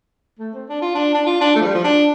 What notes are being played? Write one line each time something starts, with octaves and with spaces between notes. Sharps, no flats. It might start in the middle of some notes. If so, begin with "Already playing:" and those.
A3
C4
D4
F4
D4
D4
F4
D4
A3
F3
G3
F3
D4